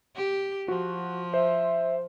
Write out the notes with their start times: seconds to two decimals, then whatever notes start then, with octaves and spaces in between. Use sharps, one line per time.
0.16 G4
0.68 F3 F#4
1.34 C5 E5